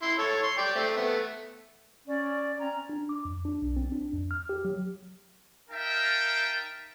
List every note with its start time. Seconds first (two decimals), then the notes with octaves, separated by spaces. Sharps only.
0.02 E4 C6
0.19 A4 C#5
0.43 C6
0.58 D5 G5 D6
0.75 A3 C4
0.96 A3 B3
2.08 C#4 D5
2.60 C4 C#4 A#5
2.89 D4
3.09 D6
3.25 F2
3.45 D4
3.62 B1
3.77 C4
3.92 D4
4.13 F2
4.31 F6
4.49 G4
4.65 F#3
5.70 D#4 A#4 E5 F5 G5 A5